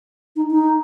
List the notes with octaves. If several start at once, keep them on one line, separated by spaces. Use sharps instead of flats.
D#4
D#4